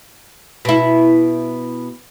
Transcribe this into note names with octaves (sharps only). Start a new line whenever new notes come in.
B2 E4